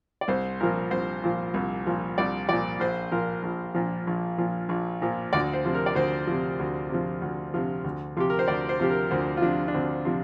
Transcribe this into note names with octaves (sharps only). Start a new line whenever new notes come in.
D5
C2 C5
A#2 F3 A#4
C2 C5
A#2 F3
C2
A#2 F3
C2 D5
A#2 F3 D5
A#1 C5
A#2 F3 A#4
A#1
A#2 F3
A#1
A#2 F3
A#1
A#2 F3
D2 D5
C5
C3 F3
A#4
D5
D2 C5
C3 F3
D2
C3 F3
D2
C3 F3
D2
C3 F3 G4
A#4
C5
D2 D5
C5
C3 F3 G4
A#4
D2 C5
F4
C3 F3 D4
D4
D2 C4
C3 F3